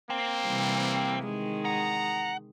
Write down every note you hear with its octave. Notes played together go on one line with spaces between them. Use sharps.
A#3 C4
C3 E3 G3
D#3 G#3
F#5 A#5